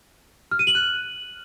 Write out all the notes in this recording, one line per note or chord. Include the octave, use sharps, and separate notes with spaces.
F6
D#7
F#7
F#6